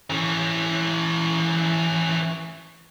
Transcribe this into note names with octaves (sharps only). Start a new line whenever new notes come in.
E3 C#4